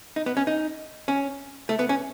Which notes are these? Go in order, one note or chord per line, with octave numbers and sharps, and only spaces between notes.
D#4
B3
C#4
D#4
C#4
A3
B3
C#4